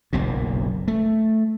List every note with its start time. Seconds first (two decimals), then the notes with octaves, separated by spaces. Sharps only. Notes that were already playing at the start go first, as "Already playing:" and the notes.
0.13 F#1 B1 A#2
0.88 A3